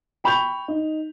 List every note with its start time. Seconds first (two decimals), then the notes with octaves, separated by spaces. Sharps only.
0.24 G5 B5 C#6 G6 F7
0.68 D#4